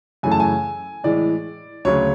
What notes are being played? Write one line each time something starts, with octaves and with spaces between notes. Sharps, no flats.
F#2 C#3 E3 A3 G#5
A5
G#5
A2 E3 G#3 D5
D2 C#3 F#3 C#5